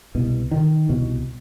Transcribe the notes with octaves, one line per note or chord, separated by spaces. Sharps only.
C2 B2
D#3
C2 B2